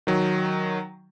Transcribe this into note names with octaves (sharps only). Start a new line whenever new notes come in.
D#3 F#3